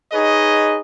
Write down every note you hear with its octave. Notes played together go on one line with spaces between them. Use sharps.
D#4 G#4 B4 C#5 D#5